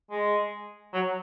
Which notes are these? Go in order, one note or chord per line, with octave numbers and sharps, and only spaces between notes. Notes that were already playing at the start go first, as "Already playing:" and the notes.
G#3
F#3